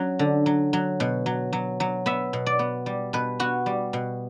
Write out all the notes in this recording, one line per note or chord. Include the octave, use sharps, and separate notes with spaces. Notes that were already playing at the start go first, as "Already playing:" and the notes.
Already playing: F#3 C#4
D3
F#3
F#3
B2
F#3
F#3
F#3
B3 E5
B2
D5
B3
G3
B2 B4
B3 F#4
G3
B2